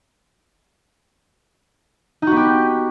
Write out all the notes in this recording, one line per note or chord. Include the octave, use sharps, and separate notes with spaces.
B3 D#4 F#4 G4